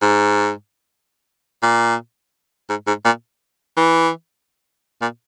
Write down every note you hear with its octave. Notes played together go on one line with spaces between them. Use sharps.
G#2
A#2
G#2
G#2
A#2
E3
A#2